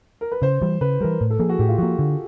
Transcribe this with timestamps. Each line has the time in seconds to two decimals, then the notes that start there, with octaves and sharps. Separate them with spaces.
0.21 A#4
0.32 B4
0.42 C#3 C5
0.62 E3 G3
0.81 C#3 B4
1.01 E3 G3 A#4
1.21 A2
1.30 A4
1.39 F3 A#3 G#4
1.49 F#4
1.59 A2 G4
1.69 F4
1.78 F3 A#3 F#4
1.99 D3